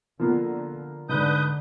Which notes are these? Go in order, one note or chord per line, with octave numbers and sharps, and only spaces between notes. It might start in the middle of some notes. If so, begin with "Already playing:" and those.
D3 F3 A#3 B3
G#2 D3 B4 D#6 G6